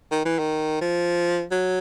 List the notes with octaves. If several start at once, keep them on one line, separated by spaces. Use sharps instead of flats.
D#3
E3
D#3
F3
F#3